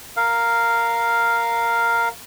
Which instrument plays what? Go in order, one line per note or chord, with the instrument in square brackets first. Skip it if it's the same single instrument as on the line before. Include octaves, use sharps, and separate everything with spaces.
[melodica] A#4 F5